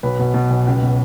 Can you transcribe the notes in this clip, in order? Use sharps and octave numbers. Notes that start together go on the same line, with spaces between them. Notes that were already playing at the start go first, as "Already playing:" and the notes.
B1 B4
B2
B2
B1
C#2
B2